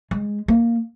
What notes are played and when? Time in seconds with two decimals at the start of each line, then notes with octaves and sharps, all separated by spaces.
0.11 G#3
0.48 A#3